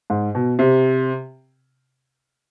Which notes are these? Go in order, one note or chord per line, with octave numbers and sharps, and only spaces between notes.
G#2
B2
C3